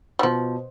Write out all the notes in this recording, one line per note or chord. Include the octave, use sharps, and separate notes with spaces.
G3
B2 F3